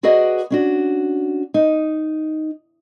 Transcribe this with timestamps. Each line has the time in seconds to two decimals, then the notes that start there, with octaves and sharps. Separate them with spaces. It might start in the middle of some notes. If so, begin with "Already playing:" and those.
0.03 F#4 G#4 B4 D5 D#5 F#5
0.50 C#4 D4 F#4
1.54 D#4